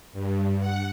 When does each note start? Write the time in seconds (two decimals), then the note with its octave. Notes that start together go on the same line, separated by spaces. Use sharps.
0.13 G2
0.60 F#5